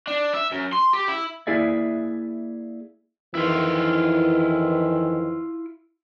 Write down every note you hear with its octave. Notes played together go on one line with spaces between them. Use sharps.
D4
E5
F#2
C6
G4
E4
A#3 E4 G#4 D5 E5
F2 D#3 E3 E4 F4